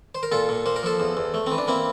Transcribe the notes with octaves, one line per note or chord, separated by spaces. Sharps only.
C5
A#4
A#2 F4 A4
A#2
A#3 C5
A#4
F3 A4 C5
E2
E2
A3
E3 C4
D4
A#3 C4 E4